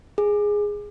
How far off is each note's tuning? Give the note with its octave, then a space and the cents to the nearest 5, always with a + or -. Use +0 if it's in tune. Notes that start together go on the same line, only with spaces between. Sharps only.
G#4 -5